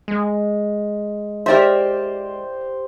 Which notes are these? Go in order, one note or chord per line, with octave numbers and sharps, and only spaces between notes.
G#3
G4 A#4 C5 D5 E5